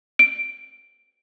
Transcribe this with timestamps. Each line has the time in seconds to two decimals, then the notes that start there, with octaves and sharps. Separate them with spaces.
0.19 D7